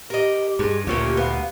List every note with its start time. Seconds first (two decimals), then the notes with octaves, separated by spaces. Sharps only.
0.10 G4 A#4 D#5
0.59 G2 G#3
0.87 D2 A#2 A#3 C#4 F4 G4
1.17 B3 F5